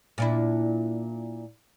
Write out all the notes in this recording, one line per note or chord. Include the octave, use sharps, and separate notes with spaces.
A#2 D4 E4